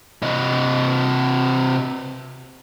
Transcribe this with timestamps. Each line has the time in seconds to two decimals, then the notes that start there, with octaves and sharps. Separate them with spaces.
0.22 C3 D#5